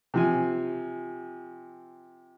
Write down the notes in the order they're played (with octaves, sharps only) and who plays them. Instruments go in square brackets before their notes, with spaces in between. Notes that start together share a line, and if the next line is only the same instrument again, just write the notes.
[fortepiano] C3 F3 G#5